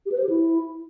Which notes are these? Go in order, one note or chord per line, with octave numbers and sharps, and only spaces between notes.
G4
B4
C5
G4
E4